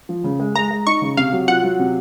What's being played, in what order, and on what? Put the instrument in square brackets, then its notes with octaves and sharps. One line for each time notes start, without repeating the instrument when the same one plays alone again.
[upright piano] F3
C#3
G#3
[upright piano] G#3 [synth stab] A#5
[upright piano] G#3
[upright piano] D#4 [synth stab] C#6
[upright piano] C#3
[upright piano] C3 [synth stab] F5
[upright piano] F#3
[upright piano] F4 [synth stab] F#5
[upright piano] F#3
C3